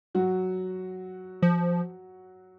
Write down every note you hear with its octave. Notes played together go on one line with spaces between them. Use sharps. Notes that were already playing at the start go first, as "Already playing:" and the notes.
F#3 F#4
F3